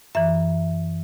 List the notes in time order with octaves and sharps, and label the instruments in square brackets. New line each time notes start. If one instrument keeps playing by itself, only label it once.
[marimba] F#2 E3 E5